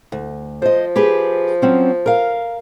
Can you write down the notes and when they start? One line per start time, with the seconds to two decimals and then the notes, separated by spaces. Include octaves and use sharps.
0.12 D2
0.62 F3 C5 D#5
0.96 G4 G#4 B4
1.62 F#3 C4 C#4
2.06 A#4 F5